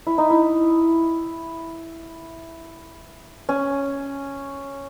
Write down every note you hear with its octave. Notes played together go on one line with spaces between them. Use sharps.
E4
D#4
E4
C#4